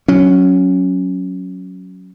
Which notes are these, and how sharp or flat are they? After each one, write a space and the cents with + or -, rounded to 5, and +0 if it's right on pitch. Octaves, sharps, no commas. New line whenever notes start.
F#3 +0 C#4 +0